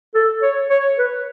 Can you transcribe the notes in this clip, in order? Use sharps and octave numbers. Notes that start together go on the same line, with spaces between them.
A4
C#5
C#5
B4